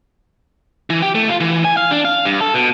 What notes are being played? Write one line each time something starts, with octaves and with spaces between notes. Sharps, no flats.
E3
G4
A3
F4
E3
G#5
F5
D4
F5
G2
A4
B2